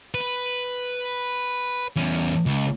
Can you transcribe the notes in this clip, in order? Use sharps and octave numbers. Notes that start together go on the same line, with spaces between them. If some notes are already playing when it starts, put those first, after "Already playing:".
B4
E2 C#4
C#2